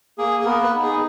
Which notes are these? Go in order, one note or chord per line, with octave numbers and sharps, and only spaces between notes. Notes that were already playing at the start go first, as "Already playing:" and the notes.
A#3 G#4
G#4
B3 A#4
B4
D#4
G#4